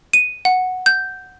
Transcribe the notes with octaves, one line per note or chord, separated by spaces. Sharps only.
D#7
F#5
G6